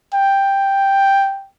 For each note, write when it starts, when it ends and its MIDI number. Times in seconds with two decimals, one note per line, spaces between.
0.14 1.49 79